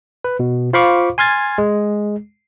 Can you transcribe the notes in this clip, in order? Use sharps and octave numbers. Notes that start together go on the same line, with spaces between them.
B4
B2
F4 C5 F5 B5 C#6 D6
G#5 C6 F6 G#6 A6
G#3